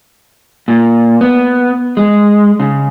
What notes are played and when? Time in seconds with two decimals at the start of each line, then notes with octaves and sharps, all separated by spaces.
0.68 A#2
1.21 B3
1.97 G#3
2.60 C#3